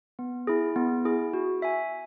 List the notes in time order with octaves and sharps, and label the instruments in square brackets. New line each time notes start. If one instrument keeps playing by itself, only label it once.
[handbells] B3
E4 G#4
B3
E4 G#4
F#4
E5 G#5